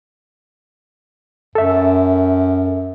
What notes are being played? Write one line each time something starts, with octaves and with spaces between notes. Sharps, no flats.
F#2 A4 E5